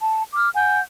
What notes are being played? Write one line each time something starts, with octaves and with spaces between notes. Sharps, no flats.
A5
D6 F6
F#5 G#5 G6